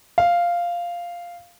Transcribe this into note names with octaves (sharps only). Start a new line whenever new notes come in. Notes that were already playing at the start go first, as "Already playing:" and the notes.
F5